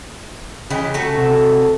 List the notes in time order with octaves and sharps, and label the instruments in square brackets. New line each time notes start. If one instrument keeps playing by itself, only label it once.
[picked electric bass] C#3 [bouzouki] E3 G#3 G4
[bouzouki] A3 F#4 A4
[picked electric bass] C3